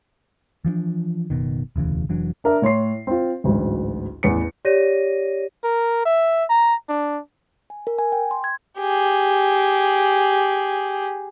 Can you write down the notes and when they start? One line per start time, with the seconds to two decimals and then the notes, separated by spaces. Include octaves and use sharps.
0.65 E3 F3 B3 D4
1.30 F#1 B1 B2 D#3
1.76 E1 D2 C#3 E3
2.09 F1 E3 F#3 D4
2.44 D4 A#4 E5
2.62 A2 C#5 C6 C7
3.07 C4 F4
3.44 A1 D2 G#2 F#3
4.23 A1 E2 B3 C#7
4.65 G4 C#5 D5 A#6 D#7
5.64 A#4
6.06 E5
6.50 A#5
6.89 D4
7.70 G#5
7.87 A#4
7.98 G#5
8.12 G5
8.31 C6
8.44 G#6
8.79 G4 G#4